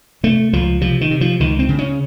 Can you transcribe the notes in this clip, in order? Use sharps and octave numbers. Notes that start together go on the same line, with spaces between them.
C3 A3
C#2 F3
C3 F3
D#3
C3
F3
C#2 D#3
C4
C#3
C#4